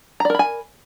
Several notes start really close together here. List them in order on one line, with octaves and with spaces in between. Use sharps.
A#5 D5 A#4 B5 G#5